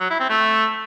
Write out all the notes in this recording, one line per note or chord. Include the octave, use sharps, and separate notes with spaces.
F#3
E4
C4
A3